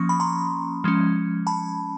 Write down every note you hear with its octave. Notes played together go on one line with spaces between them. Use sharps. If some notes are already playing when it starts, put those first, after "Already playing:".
Already playing: F3 A#3 C#4 C#6 D#6
B5
A#5 C6
F3 G#3 C#4
A5 B5